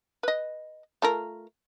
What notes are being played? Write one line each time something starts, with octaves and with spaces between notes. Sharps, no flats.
B4 D#5
A3 F4 A#4